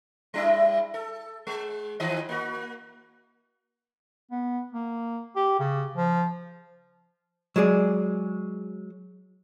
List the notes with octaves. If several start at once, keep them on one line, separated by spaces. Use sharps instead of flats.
G3 D4 E4
A4
G#3
D#3 F3 D#5
A#3 F#4
B3
A#3
G4
C#3
F3
F#3 G#3 G#4 D5